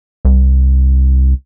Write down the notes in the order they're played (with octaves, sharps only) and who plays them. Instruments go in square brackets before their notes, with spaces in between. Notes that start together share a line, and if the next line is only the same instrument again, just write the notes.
[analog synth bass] C2